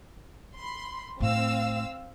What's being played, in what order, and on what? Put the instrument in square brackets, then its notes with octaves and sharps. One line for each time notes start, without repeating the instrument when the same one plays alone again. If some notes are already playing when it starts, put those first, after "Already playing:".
[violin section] B5 C6
[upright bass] A2 A3 [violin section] C4 F5 E6